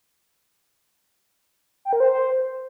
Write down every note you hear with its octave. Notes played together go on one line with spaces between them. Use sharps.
G5
A#4
C5